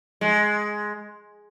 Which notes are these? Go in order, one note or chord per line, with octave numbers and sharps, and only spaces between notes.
G#3